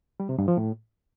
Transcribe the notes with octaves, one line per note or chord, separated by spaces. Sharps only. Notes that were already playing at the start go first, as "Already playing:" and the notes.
G3
C3
G2
F3
A2